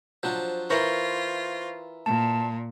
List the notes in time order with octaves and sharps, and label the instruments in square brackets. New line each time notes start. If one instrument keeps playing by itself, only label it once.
[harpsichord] F3 F#3 D4 [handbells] C5
[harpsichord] E3 A#4 [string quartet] F4 [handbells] C5 C#6 A#6
[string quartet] A#2 [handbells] A5